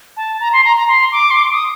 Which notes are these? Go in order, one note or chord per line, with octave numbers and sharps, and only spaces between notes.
A5
A#5
C6
A#5
A#5
C6
D6
C6
D6
D#6